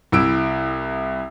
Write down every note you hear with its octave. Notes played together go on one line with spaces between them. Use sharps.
C2 E4 E6 D7